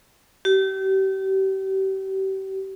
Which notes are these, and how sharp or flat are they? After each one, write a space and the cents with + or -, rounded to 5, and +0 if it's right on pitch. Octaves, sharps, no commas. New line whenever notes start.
G4 -35